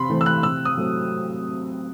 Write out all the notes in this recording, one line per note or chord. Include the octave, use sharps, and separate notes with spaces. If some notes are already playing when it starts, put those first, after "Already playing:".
Already playing: C3 B5 C6
E3 A3 C4
E6
F#6
C3 E6
D#6
F#3 A3 C4